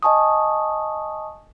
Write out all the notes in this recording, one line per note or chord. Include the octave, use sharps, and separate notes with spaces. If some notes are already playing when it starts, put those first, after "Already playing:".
D#5 G#5 A5 C#6 D#6